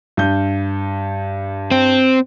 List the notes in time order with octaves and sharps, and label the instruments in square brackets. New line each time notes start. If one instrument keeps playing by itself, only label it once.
[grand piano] G2 G6
[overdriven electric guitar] C4